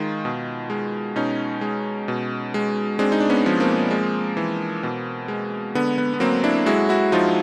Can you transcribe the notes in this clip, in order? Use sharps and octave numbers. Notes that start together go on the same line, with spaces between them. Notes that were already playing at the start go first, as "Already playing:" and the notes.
Already playing: D#3 G#3 D#4 F4
B2
G#3
B2 C#4 D#4
G#3
B2
G#3
G#3 C4 D4
D#4
D4
B3 C#4
F3
A#3 C4
G#3
E3
B2
G#3
D3 B3
B3
B3
F#3 A#3 C4
D4 E4
G#3 E4 F#4
E4 F#4
F3 D#4 F4